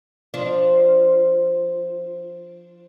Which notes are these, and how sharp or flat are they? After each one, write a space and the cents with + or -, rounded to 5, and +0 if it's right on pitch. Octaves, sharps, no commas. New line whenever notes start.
F3 +0 D4 +0